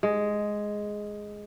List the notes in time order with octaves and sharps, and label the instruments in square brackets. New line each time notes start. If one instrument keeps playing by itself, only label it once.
[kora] G#3